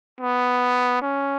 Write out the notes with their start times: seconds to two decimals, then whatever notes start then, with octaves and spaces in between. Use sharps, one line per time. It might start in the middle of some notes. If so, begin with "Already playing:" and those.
0.21 B3
1.02 C#4